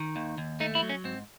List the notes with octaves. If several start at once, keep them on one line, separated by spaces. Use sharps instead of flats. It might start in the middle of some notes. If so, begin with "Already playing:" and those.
Already playing: D#3
D#2
D#2
A3 D#4
E4
F#3
C#4
G#2 C4